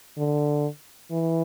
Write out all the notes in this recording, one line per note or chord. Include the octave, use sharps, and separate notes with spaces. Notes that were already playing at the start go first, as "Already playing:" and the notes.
D3
E3